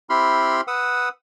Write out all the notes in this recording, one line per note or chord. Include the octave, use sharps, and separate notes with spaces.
C4 E4 G4 B5 C6 F6
B4 F#5 D#6 E6